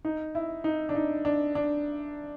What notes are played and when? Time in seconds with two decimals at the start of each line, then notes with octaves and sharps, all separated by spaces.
0.05 D#4
0.35 E4
0.64 D#4
0.89 D4
0.95 D#4
1.25 D4
1.55 D4